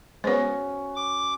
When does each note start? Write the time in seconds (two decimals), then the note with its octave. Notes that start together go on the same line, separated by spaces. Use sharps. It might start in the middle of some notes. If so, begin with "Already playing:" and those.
0.24 G#3 B3 C#4 F#4 C5 C#5
0.96 D6